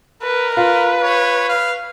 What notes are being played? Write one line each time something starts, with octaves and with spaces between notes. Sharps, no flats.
A#4 B4
F4 B4
C#5
F5